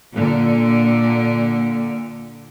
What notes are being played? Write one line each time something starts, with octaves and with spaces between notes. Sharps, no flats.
A#2 D3